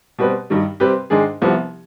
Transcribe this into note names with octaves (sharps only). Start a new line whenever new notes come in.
B2 G3 C4 G4 B4
G2 D#3 G3
C3 G3 C4 G4 B4
G#2 D#3 G#3 D4 G#4
C2 C3 F3 B3